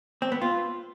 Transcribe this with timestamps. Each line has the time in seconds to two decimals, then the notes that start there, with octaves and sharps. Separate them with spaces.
0.22 C4
0.32 B3
0.41 F4